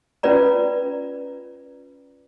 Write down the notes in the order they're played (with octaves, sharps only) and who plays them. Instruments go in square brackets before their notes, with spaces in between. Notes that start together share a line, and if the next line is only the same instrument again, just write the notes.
[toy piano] C#4 F4 B4 D5 A#5